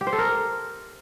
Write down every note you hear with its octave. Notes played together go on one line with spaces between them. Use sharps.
G4
C5
A4
A#4